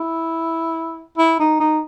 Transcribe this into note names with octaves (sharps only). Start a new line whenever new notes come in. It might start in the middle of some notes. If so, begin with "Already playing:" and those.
Already playing: E4
E4
D#4
D#4